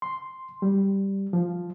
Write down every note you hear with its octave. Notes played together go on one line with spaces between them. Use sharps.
C6
G3
F3